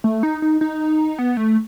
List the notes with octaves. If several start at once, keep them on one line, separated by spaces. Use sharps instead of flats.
A3
D#4
D#4
D#4
B3
A3